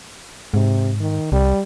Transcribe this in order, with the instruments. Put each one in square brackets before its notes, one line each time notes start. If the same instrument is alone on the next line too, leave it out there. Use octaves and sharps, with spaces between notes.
[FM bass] G#2 [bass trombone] C3
[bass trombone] D#3
[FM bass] C2 [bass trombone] G3